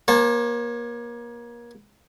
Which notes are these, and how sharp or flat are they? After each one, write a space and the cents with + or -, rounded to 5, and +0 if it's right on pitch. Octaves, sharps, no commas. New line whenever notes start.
A#3 +30 C#5 -40 A5 +0